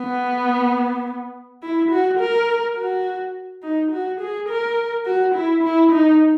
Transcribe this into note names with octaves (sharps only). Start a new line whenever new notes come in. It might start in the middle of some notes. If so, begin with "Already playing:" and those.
Already playing: B3
E4
F#4
A#4
F#4
D#4
F#4
G#4
A#4
F#4
E4
E4
D#4